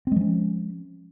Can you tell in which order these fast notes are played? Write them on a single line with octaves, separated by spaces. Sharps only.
C4 G#3 F3 C#4